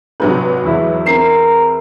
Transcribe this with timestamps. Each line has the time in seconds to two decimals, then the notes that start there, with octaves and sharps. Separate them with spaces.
0.20 G#1 C3 F#3 B4
0.63 E2 E4
1.06 C4 A#4 C7 E7